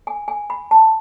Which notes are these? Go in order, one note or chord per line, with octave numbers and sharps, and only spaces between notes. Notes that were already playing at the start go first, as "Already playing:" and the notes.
G#5
G#5
B5
A5